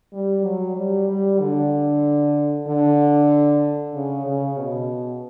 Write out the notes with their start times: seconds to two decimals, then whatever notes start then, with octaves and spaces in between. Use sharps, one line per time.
0.13 G3
0.45 F#3
0.77 G3
1.09 G3
1.40 D3
2.68 D3
3.94 C#3
4.26 C#3
4.58 B2